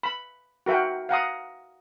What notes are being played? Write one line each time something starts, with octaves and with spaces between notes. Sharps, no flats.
B5
F#4 A#4 E5 F#5 G5
F5 F#5 A#5 D#6